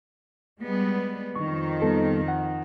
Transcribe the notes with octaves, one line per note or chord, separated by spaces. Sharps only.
G3 G#3 B3
F2 D#3 C#6
G3 B3 A4
F#5